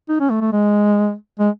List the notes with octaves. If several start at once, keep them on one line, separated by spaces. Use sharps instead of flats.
D#4
C#4
A3
A3
G#3
G#3